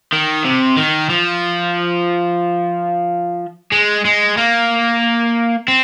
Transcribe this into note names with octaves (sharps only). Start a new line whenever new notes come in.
D#3
C3
D#3
F3
G#3
G#3
A#3
C4